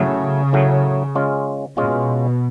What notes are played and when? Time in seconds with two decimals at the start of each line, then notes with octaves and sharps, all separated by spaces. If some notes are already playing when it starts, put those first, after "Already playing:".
Already playing: A2 C#3 F#3 A3
0.53 A2 F#3 A3
1.15 G#3 C#4 F4
1.77 B2 G#3 C#4 F4